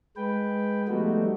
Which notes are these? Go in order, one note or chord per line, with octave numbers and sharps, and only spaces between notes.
G#3 B4 G5
F3 G3 A3 B3 D#4 F#4